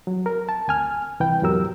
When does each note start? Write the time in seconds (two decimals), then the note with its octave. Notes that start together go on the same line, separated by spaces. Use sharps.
0.07 F#3
0.26 A#4
0.49 A5
0.68 D2 G#5 F6
1.20 C2 E3 B4 G5
1.42 E2 G#2 F#3 G4 A#4 E6